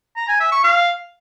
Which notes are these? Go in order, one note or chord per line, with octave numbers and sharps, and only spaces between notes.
A#5
G#5
E5
C#6
F5